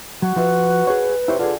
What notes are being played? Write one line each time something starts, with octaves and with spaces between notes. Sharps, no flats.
F#3 F#4
F3 F4 B4 E5
G#4 C#5
C3 E4 C5 C#5
D3 F4 G#4